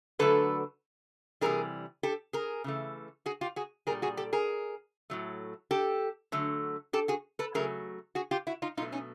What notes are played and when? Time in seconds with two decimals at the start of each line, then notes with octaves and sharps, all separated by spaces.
0.19 D3 F#3 A3 A4 B4
1.41 C3 E3 G3 G#4 A#4
2.03 G4 A4
2.33 G#4 A#4
2.64 C#3 E3 A3
3.26 F#4 G#4
3.41 F4 G4
3.56 F#4 G#4
3.87 G3 G#4 A#4
3.90 A#2
4.02 F#4 G#4
4.17 G4 A4
4.33 G#4 A#4
5.10 A2 F#3 A3
5.71 G4 A4
6.32 D3 F#3 A3
6.93 G4 A4
7.08 F#4 G#4
7.39 A4 B4
7.54 C#3 F#3 A3 G#4 A#4
8.15 F#4 G#4
8.31 F4 G4
8.47 E4 F#4
8.62 D#4 F4
8.77 B2 F#3 A3 D#4 F4
8.92 C#4 D#4